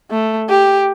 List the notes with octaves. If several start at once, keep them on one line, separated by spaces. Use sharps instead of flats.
A3
G4